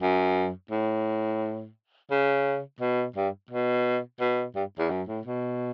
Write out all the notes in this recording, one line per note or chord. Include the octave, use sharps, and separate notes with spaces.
F#2
A2
C#3
B2
G2
B2
B2
G2
E2
F#2
A2
B2